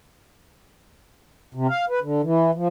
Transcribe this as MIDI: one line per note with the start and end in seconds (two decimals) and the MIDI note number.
1.54 1.67 48
1.69 1.85 77
1.90 1.99 71
2.02 2.21 50
2.23 2.51 52
2.55 2.68 53